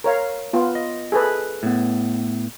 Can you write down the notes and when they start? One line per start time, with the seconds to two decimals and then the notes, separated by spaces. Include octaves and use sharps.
0.04 A#4 C#5 F5
0.53 B3 F4
0.75 D#5
1.12 G#4 A4 B4
1.63 A2 B3